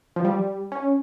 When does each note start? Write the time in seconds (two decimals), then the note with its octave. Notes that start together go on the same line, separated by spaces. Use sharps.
0.16 F3
0.25 G3
0.72 C#4